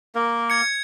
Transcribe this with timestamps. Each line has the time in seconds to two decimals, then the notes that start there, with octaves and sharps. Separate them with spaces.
0.15 A#3 A#4
0.50 G#6 C#7